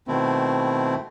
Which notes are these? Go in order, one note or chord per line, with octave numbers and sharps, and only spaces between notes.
B2 D#3 A3 C4 E4